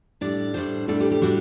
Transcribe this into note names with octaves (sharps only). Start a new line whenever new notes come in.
A2 G3 D4 D5
A2 G3 D4 C5
A2 G3 D4 A4
G4
G4
A2 G3 D4 F#4